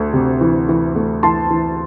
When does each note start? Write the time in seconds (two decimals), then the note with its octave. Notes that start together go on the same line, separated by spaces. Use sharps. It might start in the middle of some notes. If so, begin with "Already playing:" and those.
Already playing: D2 A3
0.13 C3
0.41 E3
0.69 E3
0.95 A3
1.23 E3 A5 C6
1.50 E3